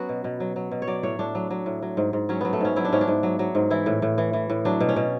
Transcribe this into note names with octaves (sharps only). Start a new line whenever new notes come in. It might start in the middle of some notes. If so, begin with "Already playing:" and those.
Already playing: F#3 B3 C#4 F#4
B2
B2
F#3
F#3
B2
C#5
F#3 D5
A2 C#5
A2 D4
F#3
F#3
A2
F#3
G#2
G#2
F#3 C#4
F#3 B3
A3
G#2 C#4
F#3 E4
D4
G#2 C#4
D4
G#2
F#3
F#3
G#2
E3 E4
A2
A2
E3
E3
A2
F#3 D4
B2
C#4
B2